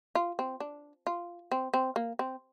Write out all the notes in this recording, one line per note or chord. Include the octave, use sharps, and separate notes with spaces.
F4
C4
D4
F4
C4
C4
A#3
C4